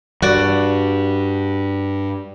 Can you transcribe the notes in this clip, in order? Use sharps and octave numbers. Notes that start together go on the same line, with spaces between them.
G2 F#4 D5